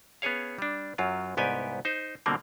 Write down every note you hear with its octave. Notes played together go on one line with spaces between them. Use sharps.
B3 C#4 G#4 C#5 F5
G3 D4
F#2 F#3 F4
C2 G#2 B3 G4 G5 G#5
D#4 C5
B2 D3 G3 A#3 C4